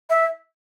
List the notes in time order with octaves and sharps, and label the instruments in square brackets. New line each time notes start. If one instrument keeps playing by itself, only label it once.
[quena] E5